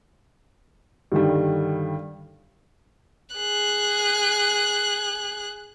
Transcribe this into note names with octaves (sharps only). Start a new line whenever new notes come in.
G2 D3 D#3 G3
G#4 F#6